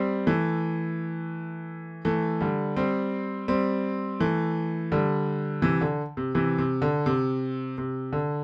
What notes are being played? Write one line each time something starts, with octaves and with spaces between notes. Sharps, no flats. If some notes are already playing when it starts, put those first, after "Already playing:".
Already playing: G3 C4
E3 A3
E3 A3
D3 G3
G3 C4
G3 C4
E3 A3
D3 G3
C3 E3
D3
C3
C3 E3
C3
D3
C3
C3
D3